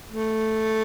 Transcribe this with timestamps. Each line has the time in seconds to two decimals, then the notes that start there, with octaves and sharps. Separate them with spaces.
0.12 A3